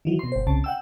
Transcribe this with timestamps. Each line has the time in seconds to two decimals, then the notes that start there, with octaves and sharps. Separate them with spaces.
0.05 D#3 E3 F#3
0.19 B2 C6
0.32 G1 C5
0.47 C2 C#3 A5
0.64 F#5 G5 E6